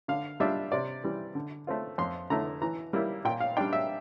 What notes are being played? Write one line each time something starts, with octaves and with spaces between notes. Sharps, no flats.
D3 F5
G3 D4 F4 E5
C3 D5
E3 G3
D3
A3 C4 F4
F2 C6
D3 A3 E4 A#5
E3 A#5
G3 A#3 E4
A#2 G5
F5
G3 D4 G5
E5